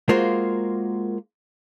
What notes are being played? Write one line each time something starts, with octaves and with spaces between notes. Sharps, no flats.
G#3 A#3 F4 F#4 A#4 C5